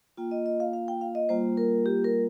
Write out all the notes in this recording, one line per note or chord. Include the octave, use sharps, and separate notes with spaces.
A#3 F4 G5
D#5
D#5
F5
F5
G5
F5
D#5
G3 A#3 F4 C5
A#4
G4
A#4